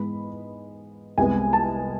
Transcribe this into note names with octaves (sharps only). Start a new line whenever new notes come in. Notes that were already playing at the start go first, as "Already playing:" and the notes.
Already playing: G#2 E3 G#3 B3 B5
C2 C3 G#3 B3 G#5
A5